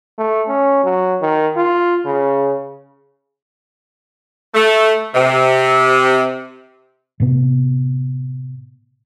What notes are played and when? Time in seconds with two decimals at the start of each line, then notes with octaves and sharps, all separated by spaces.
0.18 A3
0.48 C#4
0.84 F#3
1.22 D#3
1.56 F4
2.05 C#3
4.55 A3
5.15 C3
7.20 A2 C3 B3